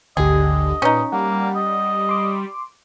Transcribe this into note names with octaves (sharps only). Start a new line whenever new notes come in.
G#1 D2 D3 G4 G#4 D#5
A#2 C#4 D#4 B4
G3 A#3 F#5
D#5
C6 D6